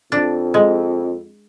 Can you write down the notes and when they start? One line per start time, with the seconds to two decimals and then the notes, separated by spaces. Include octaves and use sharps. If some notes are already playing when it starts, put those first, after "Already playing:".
0.12 F2 D4
0.54 G#3